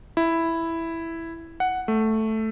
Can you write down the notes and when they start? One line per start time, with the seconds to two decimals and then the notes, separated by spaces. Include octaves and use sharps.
0.17 E4
1.60 F#5
1.88 A3